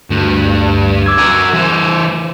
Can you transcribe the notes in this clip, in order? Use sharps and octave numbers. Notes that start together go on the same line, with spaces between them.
D2 G2
D6 E6 G#6
F#4 A#4
E3 C5